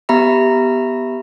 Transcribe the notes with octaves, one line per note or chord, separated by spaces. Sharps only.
B3 G4 E5 A#5 B5